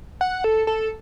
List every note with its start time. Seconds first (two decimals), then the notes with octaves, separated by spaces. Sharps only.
0.21 F#5
0.44 A4
0.67 A4